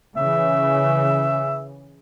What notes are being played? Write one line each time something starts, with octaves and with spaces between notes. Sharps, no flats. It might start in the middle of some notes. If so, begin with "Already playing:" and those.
C#3 E3 E5